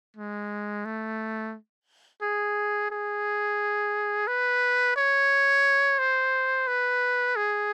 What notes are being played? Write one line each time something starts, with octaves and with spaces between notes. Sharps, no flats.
G#3
A3
G#4
G#4
B4
C#5
C5
B4
G#4